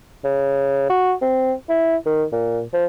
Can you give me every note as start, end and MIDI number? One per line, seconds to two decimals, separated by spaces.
0.24 0.88 49
0.90 1.14 66
1.21 1.53 60
1.69 1.96 64
2.06 2.24 51
2.32 2.61 46
2.73 2.86 53